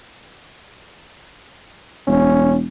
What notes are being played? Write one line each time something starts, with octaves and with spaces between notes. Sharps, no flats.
E1 C#4